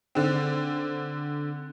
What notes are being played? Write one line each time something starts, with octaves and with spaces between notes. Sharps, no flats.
D3 C4